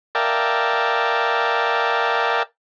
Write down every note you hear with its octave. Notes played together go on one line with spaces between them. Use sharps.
A#4 D5 E5 F5 G5 A5